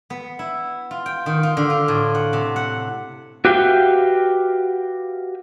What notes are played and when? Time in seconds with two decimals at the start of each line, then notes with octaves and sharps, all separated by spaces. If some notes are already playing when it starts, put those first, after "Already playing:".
0.10 B3
0.39 E4
0.91 F4
1.06 G5
1.26 D#3
1.43 F4
1.57 D3
1.70 F4
1.88 A2
2.15 F#5
2.33 C3
2.56 F#5
3.45 F#4 G4 B4 E5 F5 G5